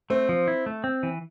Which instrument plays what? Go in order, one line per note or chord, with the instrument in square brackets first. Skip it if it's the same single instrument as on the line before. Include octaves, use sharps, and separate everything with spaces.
[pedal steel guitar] A3 [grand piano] C4
[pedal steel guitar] F3
E4
A3
C4
E3